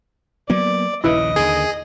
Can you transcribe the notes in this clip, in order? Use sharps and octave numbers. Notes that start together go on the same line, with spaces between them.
F#3 A#3 B3 D5
A#1 D#2 C#3 E4 B4 D#5
D#2 D3 D#3 G#4